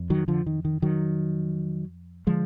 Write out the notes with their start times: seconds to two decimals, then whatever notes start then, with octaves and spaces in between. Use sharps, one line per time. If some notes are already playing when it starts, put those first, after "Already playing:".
Already playing: F2
0.10 D#3 F#3
0.28 D3 F3
0.46 D#3
0.65 D#3
0.82 D#3 F#3
2.27 D3 F3 G#3